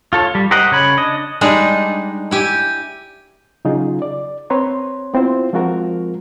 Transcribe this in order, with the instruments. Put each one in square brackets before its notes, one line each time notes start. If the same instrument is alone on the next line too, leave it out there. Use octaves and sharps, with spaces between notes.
[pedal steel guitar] F4 A4 C#5
G3
G4 A#4 C5 D#5 F#5
C#3 C#5 B5
D4 D#5
[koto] G3 G#3 D4 D#4
E4 G4 G#5
[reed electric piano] C#3 F#3 D#4 F4 G#4
D5
C4 B4 C#5 A#5 C6
B3 C4 E4 F4 C5
F3 G#3 C4 F4 F#4 A#4